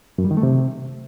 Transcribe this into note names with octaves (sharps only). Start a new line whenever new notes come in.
F#2
G3
D#3
A3
C3